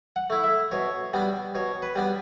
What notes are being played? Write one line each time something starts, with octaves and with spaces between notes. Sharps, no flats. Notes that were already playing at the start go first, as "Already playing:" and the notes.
F#5
A3 E4
E5
B2 C#5
G3 B3 D4
B2 C#5
B4
G3 B3 D4